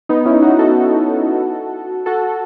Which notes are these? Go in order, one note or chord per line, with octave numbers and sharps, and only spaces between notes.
B3 D#4
C#4 E4
D#4 F#4
F#4 A4
F#4 A4